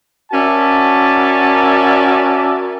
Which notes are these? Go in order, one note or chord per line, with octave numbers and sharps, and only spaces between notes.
C#4 F#4 A#4 D5 E5 A5